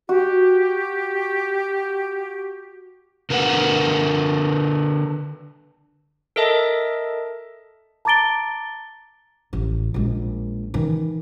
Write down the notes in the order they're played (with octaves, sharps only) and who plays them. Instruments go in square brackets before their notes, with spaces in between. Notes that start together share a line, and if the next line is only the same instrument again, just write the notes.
[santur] F#4 [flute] G4
[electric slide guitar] D3 A#4 B4 E5 F#5
[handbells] A4 A#4 D#5 E5 A5
[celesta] A5 A#5 D6 A6 D7 G7
[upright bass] A1
A#1 G#3
D#3 E3